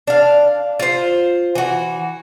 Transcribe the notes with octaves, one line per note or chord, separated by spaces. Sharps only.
D4 F5
F4 C5
E3 F#4